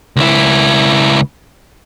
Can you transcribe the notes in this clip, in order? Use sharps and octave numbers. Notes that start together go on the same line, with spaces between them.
C#2 E4